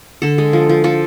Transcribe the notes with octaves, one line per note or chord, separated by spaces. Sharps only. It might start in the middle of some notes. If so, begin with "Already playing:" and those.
D3 A4
G#3
F3
F3
F3 A4